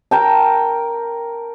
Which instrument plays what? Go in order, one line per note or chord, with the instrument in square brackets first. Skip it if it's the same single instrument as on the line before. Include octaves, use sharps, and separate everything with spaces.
[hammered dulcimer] A#4 G5 A5